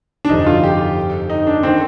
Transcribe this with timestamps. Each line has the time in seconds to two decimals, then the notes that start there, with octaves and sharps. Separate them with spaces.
0.25 D4
0.29 G1 F2 C3 D#4
0.47 F4
0.64 G4
1.30 D#4
1.47 D4
1.63 D#3 A#3 C4